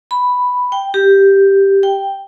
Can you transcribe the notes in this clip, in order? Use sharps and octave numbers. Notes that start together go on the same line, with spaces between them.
B5
G5
G4
G5